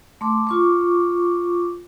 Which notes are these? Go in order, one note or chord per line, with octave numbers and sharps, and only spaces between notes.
A3 C6 D6
F4 C#6 D6